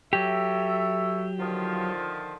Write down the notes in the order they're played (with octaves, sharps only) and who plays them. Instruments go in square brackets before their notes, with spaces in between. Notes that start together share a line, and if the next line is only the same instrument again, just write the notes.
[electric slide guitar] F#3 G4 [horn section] A4 C#5 E5
[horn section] D3 D#3 F3